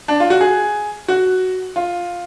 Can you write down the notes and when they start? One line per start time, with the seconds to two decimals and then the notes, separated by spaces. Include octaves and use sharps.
0.08 D4
0.20 F4
0.30 F#4
0.41 G#4
1.08 F#4
1.76 F4